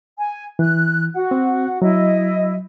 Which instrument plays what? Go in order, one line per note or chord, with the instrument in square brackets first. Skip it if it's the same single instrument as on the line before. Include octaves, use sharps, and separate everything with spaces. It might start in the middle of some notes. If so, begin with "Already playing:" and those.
[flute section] G#5
[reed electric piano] E3 [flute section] F#6
[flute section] F#4 F#5
[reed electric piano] C4
[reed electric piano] F#3 [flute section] E4 D#5